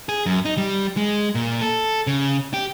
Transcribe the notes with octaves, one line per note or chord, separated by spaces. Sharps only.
G#4
F#2
D#4
G3
G#3
A#2
A4
C#3
G4